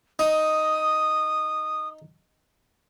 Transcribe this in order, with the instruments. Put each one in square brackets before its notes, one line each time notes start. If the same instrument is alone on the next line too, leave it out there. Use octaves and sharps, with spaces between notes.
[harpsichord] D#4 [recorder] D#6